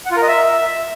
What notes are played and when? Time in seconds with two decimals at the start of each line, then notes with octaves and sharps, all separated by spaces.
0.06 F#5
0.11 F4
0.17 A#4
0.22 D#5
0.28 E5